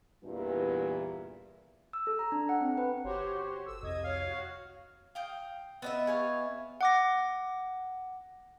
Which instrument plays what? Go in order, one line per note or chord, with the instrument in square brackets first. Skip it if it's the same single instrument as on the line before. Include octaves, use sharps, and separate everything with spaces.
[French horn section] E2 G2 A#2 E3
[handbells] E6
A4
A#5
D4
F#5
C4
B4
[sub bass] G1 [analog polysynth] F#4 C5 C#5 [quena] G4
[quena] A4 [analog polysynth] E6
[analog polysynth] C2 D#6 G#6 [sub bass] F2 [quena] D#5
[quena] C#5 [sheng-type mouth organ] F5
[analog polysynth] F#4
[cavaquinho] F5 G5 D#6
[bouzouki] B3 D#5 E5
[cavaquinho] G#4 C#5 F5
[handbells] F#5 D6 A#6